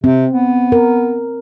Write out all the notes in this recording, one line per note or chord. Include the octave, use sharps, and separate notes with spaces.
C3 C4
B3
A#4